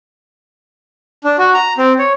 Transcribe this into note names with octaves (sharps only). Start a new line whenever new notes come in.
D4
F#4
A#5
C4
C#5